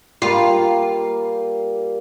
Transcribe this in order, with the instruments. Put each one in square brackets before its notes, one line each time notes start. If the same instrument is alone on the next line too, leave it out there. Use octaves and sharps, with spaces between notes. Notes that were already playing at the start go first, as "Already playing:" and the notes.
[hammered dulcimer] G3 A#3 [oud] F4